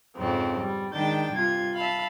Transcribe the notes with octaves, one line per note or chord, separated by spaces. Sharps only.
F2 G#2 C#3 F3 C4
G3
D#3 G#3 D4 G5 G6 A6
G2 C3 F4 G#6
E5 F5 A5 B5